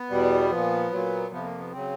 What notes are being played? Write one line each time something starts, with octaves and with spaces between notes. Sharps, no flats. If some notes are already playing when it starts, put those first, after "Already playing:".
Already playing: B3
E2 B2 G3
A#2 F3
A#2 F#3
F2 C3 F3 B3
A#3
B3
C#3 F#3 C4